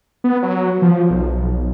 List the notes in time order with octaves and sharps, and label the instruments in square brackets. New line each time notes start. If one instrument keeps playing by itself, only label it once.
[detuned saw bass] B3
F#3
F3
B1